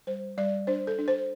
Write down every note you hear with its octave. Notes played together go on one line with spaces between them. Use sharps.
G3 C5
G3 D5
D4 C5
A4
D4
C5